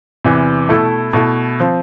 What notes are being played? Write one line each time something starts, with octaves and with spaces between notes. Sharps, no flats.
E2 C3 E3
B2 A3 E4 A4
B2 A3 E4 A4
F3 C4